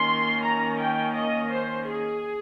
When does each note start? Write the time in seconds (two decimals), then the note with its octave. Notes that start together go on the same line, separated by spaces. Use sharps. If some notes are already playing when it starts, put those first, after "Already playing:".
Already playing: D#3 A#3 C#4 C6
0.43 A#5
0.79 G5
1.15 D#5
1.51 C5
1.87 G#4